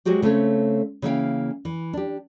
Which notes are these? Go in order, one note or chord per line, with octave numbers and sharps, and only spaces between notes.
F#3 G#3 F#4 G4 C5
C#3 A3 C4 A4 C#5
C#3 E3 A#3 E4 F5 G5
E3
D4 G4